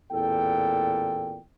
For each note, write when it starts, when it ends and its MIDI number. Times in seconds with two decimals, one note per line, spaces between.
0.12 1.38 33
0.12 1.38 40
0.12 1.38 46
0.12 1.38 69
0.12 1.38 79